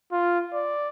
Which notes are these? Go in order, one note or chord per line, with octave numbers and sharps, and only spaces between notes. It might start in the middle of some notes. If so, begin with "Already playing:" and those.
F4
D5